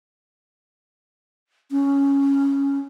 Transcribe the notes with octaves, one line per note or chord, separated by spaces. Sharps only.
C#4